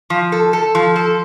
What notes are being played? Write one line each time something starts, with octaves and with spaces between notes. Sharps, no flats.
F3
A4
A4
F3
A4